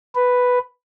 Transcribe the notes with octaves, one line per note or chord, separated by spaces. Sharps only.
B4